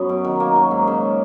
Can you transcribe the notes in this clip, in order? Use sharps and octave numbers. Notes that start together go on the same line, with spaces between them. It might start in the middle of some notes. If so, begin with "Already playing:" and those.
Already playing: F#2 F#3 B3
B2
D#3
A#3
F#3
G#2
C#3